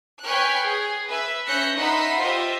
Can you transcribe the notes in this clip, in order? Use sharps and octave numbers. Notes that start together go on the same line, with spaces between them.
B4 C#5 G5 G#5 F6 F#6
G#4
B4 E5
C#4 E5 F#6 G6 A#6 C#7
D#4 B4 E5 F#5 B5 C6
F4 G4 C5 D#5 E5